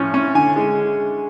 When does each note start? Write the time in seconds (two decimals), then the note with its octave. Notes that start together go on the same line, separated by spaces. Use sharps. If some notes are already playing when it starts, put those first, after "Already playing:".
Already playing: A2 F3 C#4
0.14 C#4
0.35 D3 G#5
0.56 G#3